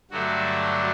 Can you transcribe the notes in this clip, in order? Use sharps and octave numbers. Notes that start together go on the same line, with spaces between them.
G2 D3 F#3 A3 F#4